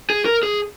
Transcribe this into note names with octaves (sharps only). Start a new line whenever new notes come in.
G#4
A#4
G#4